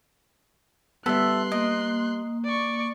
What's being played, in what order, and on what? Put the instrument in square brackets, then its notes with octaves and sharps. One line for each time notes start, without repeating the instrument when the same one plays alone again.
[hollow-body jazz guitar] G3 B3 [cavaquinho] A4 E5 [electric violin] C6 F#6
[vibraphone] A#3 [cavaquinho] D#5
[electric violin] D5 C#6